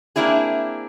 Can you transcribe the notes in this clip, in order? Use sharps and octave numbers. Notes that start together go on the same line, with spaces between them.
A#3 C4 D4 E4 G#4